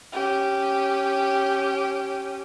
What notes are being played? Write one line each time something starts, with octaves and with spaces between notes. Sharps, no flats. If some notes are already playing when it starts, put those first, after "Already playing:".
C#4 G4